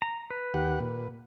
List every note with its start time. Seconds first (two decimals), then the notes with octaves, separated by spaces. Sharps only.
0.02 A#5
0.30 B4
0.54 D#2 G4 F#5
0.80 A#2